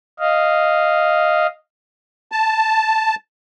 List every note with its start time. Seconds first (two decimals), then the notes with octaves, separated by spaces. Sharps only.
0.19 D#5 F5
2.32 A5